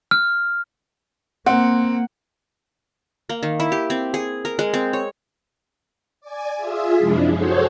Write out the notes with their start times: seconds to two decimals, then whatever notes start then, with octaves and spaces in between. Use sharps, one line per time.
0.11 F6
1.46 A#3 C4 F#5
3.29 A#3
3.43 D#3
3.60 E4
3.72 G4
3.90 C4
4.14 G#4
4.45 A#4
4.59 G#3
4.74 C4
4.93 C#5
6.21 D5 G#5
6.57 F4 G#4 E5
6.96 F#2 C3 F3 G#3 D4 E4
7.29 F#4 G#4 A4 C5 C#5